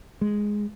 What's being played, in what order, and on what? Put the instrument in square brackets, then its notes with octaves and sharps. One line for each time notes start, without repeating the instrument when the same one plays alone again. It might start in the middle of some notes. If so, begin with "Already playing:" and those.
[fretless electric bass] G#3